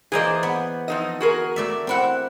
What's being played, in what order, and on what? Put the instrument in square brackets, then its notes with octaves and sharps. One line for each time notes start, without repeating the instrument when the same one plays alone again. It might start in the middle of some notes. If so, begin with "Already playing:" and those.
[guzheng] E3 A#3 D5 [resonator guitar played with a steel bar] G#4 C5 D#5
[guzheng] B3
[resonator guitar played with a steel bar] F2 D#4 D#5
F#4 G#4 A#4
[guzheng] A3 D5 E5
C4 E4 F#5